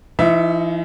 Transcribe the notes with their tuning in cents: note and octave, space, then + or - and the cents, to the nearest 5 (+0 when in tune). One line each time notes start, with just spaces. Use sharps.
E3 +45 D#4 +25 E5 +0